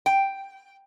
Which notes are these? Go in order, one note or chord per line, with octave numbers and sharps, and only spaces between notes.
G5